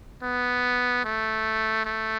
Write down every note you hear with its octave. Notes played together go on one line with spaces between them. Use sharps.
B3
A3
A3